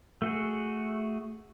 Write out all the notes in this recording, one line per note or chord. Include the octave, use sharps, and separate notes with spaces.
A3 F#4 G#4